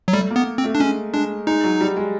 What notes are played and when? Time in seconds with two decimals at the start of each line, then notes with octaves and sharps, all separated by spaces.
0.08 F#3
0.13 G3 A3
0.30 A#3
0.36 B3
0.58 C4
0.64 A3
0.75 D4
0.80 G#3 C#4
1.13 G#3 D4
1.47 G#3 D#4
1.64 F#3
1.81 G3
1.97 G#3